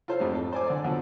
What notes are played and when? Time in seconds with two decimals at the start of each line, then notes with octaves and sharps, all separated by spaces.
0.08 F4 A4 C5 C#5 F5
0.20 F2 G#2 A3 G4
0.35 A4
0.53 C5 D5 G#5 D6
0.67 D3 D5
0.84 B2 D3 F3 F#3